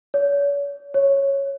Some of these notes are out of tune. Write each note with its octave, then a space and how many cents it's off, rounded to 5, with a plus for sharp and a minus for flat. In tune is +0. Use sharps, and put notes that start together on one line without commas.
C#5 +40
C#5 -10